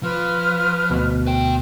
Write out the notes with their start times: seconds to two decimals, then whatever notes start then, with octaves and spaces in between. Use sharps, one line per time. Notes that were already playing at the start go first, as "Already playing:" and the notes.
0.03 F3 B4 F6
0.90 D2 B2
1.27 B4 G5